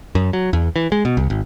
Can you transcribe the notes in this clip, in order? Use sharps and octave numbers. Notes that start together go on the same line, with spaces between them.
F#2
F#3
E2
E3
G#3
B2
C2
G#1